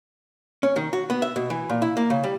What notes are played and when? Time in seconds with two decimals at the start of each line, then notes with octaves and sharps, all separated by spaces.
0.63 C#4
0.76 D#3
0.93 F#4
1.10 B3
1.22 E5
1.36 B2
1.50 E3
1.70 A#2
1.82 E4
1.97 A#3
2.10 C#3
2.23 G3